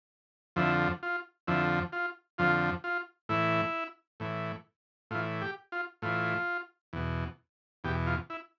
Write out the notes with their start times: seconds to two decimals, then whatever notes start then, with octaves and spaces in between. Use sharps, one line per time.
0.56 F2 D3 F3 E4
1.03 F4
1.48 F2 D3 F3 E4
1.92 F4
2.38 F2 D3 F3 F4
2.84 F4
3.29 A2 E3 E4
4.20 A2 E3
5.11 A2 E3 F4
5.41 G4
5.72 F4
6.02 A2 E3 F4
6.93 E2 B2
7.84 E2 B2 G4
8.07 F4
8.30 E4